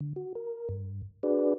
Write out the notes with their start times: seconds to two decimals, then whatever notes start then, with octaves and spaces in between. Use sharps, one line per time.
0.01 D3
0.16 F#4
0.35 A#4
0.69 G2
1.23 D4 F#4 G#4 B4 D5